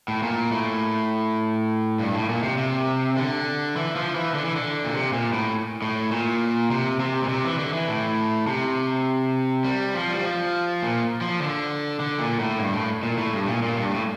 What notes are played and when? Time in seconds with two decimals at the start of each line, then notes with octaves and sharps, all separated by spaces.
0.08 A2
0.22 A#2
0.52 A2
1.99 G2
2.14 A2
2.29 A#2
2.43 C3
2.58 C3
3.17 D3
3.76 E3
3.96 F3
4.15 E3
4.35 D3
4.45 E3
4.56 D3
4.85 A#2
4.93 C3
5.13 A#2
5.33 A2
5.82 A2
6.12 A#2
6.71 C3
7.00 C3
7.23 A#2
7.29 C3
7.44 E3
7.59 D3
7.73 E3
7.88 A2
8.47 C3
9.64 G3
9.95 F3
10.11 G3
10.23 F3
10.83 A#2
11.21 F3
11.42 D3
12.00 D3
12.19 A#2
12.39 A2
12.59 G2
12.73 A2
13.03 A#2
13.18 A2
13.32 G2
13.47 A#2
13.63 A#2
13.77 G2
13.91 A2